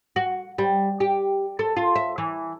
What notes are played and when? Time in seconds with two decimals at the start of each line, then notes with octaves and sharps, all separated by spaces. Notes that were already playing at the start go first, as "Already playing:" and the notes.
0.16 F#4
0.58 G3
1.00 G4
1.59 A4
1.77 F4
1.95 E5
2.18 E3